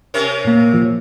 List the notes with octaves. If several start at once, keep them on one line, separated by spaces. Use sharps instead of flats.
C3 C#4 A#4
A#2 A#3
F3